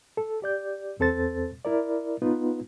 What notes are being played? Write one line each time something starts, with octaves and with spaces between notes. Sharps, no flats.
A4
G4 D5 G6
E2 C4 A4 C5 A6
E4 A#4 D5
B3 D#4 F4 B4